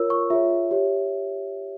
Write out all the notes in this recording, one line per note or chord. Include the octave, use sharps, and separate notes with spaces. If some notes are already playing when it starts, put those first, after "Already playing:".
Already playing: F4 A#4 C#5 E6
C#6
F4 G#4 C#5 E5
G4 C#5